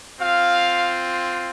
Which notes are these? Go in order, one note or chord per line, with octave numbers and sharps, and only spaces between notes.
C4 F4 F5